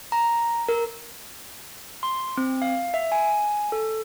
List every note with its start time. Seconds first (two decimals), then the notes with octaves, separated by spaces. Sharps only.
0.12 A#5
0.69 A#4
2.03 C6
2.38 C4
2.62 F5
2.94 E5
3.12 G#5
3.72 A4